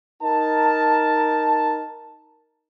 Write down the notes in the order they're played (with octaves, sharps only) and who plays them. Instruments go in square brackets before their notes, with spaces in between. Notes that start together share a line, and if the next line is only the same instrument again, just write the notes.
[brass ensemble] D#4 A#4 A5